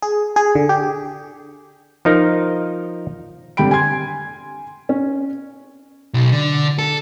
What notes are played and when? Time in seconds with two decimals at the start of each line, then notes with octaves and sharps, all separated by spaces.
0.02 G#4
0.36 G#4
0.55 D3
0.69 G4
2.05 F3 D#4 A#4
3.57 F1 D3 G3 G5 B5 D7
3.71 G#5 C6 G#6
4.89 C#4
6.14 B1
6.32 D3
6.78 A4